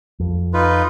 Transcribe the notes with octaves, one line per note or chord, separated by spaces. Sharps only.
F2
D#4 F4 B4